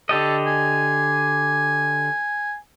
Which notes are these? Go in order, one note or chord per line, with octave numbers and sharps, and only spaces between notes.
D3 G4 A4 D#5
G#5